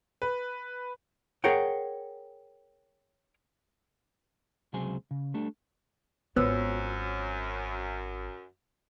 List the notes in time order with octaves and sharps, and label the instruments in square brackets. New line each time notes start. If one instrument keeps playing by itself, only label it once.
[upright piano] B4
[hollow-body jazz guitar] G#4 A#4 C#5 F#5 G5
[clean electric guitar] C#2 C3 F#3 G#4 C5 G#5
C#3
G3 A3 D4 A4
[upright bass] G#1 F4 [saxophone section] F#2 [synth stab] B3 [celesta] C5 C#5 E6